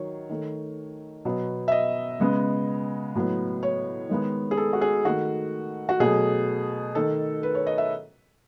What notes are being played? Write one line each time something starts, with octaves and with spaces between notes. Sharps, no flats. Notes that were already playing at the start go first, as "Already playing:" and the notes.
Already playing: D#3 F#3 C#5
D#3 A3
B2 F#3 B3
E5
D#5
C#3 G#3 B3
A2 F#3 B3
C#5
D#3 G#3 B3
G#4
A4
F#4
G#4
D#3 A3 F#4
F#4
B2 F#3 A3 G#4
D#3 A3 A4
B4
C#5
D#5
E5